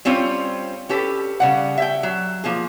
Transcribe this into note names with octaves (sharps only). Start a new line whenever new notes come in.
G3 C4 C#4 F4 C#5
C#4 G4 A4 B4
C#3 G3 F#5
E5 G5
F#3
F3 A#3 G#4